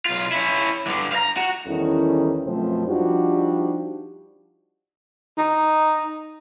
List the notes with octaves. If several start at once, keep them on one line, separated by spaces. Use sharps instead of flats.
B1 F4
C#4 E4
G2 D3
F5 A#5
F#4 F#5
E2 D#3 G3 C#4 E4 A4
F#2 B2 F3 A3 C4 C5
F3 G3 D4 D#4 F#4 G4
D#4